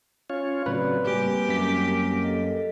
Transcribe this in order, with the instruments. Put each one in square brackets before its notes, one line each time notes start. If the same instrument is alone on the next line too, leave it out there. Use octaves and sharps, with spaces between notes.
[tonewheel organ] C#4 F4 C#5
[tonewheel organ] A2 C#3 F#3 [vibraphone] C4 D5 [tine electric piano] B4
[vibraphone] G3 C4 G#5 [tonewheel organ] A#3 [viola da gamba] G4
[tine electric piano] F#2 B6
[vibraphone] A4 D#5